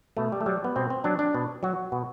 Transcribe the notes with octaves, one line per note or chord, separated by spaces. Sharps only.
B2 A3
G3
A3
F#3 G3
B3
B2 C4
C4
F#3 D4
D4
B2
F#3 F#4
B2